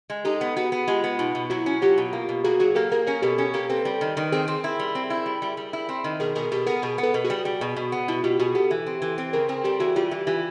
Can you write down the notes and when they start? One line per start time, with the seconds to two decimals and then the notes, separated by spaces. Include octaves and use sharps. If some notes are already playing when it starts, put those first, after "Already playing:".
0.10 G#3
0.25 D#4 G4 A4
0.41 B3
0.57 B3 F#4 G#4
0.72 B3
0.88 G#3 F4 G4
1.04 B3
1.19 B2 D#4 F4
1.35 B2
1.50 F#3 E4 F#4
1.66 C#4
1.82 F#3 F4 G4
1.98 B2
2.13 A#3
2.29 B2
2.44 A#3 F#4 G#4
2.59 F#3 F#4 G#4
2.75 A#3 G4 A4
2.92 A#3 G#4 A#4
3.07 C#4 G#4 A#4
3.22 B2 G4 A4
3.38 C#4 G4 A4
3.53 A#3 G4 A4
3.69 C4 A4 B4
3.85 G3
4.01 D#3
4.17 D#3
4.32 C4 G#4 A#4
4.48 C4
4.64 E4
4.80 G3
4.95 C4
5.10 E4
5.26 G3
5.42 G3
5.57 G3
5.73 E4
5.89 C4
6.04 D#3
6.20 B2 G#4 A#4
6.35 B2 G#4 A#4
6.52 B2 G4 A4
6.67 B3 G#4 A#4
6.82 B2 G#4 A#4
6.98 B3
7.03 A4 B4
7.14 B2
7.24 F#4 G#4
7.30 G3
7.45 G3
7.61 B2
7.76 B2
7.92 B3
8.08 B2 E4 F#4
8.24 B2 F4 G4
8.39 B2 F#4 G#4
8.55 B3 G4 A4
8.71 E3
8.86 C4
9.02 E3
9.18 C4
9.33 C#3 G#4 A#4
9.48 C4 G#4 A#4
9.64 G3 G4 A4
9.80 E3 F#4 G#4
9.96 G3 F4 G4
10.11 E3
10.27 E3 F4 G4